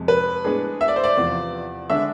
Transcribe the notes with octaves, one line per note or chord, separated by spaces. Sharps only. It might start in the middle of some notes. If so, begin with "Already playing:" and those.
Already playing: F2 C3 G#3
B4
A2 G#3 B3 D4 G#4
E5
D5
C5
D5
E2 C3 F3 B3
D3 G#3 D4 E5